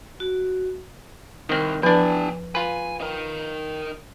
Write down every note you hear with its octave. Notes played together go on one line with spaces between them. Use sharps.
F#4
C2 D#3 C4
E2 F3 D4 G4 G#5
F4 B4 G#5
D#4 A#4